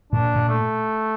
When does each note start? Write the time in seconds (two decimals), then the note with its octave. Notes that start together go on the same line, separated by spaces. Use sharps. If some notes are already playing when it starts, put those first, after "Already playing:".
0.12 A#2 D4
0.36 A#2
0.48 A3